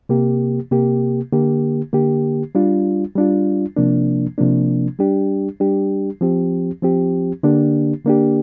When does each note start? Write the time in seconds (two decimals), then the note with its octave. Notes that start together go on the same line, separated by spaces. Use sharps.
0.09 C3 A#3 G4
0.72 C3 A#3 G4
1.32 D3 A#3 G4
1.93 D3 A#3 G4
2.55 G3 D4 F4
3.16 G3 D4 F4
3.76 C3 F3 A#3 D4
4.38 C3 F3 A#3 D4
4.99 G3 D4 G4
5.60 G3 D4 G4
6.21 F3 C4 G4
6.82 F3 C4 G4
7.43 D3 A#3 D4 G4
8.05 D3 A#3 D4 G4